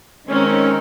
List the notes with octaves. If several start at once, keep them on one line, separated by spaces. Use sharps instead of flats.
D#3 G#3 C4 C#4 D#4 A#4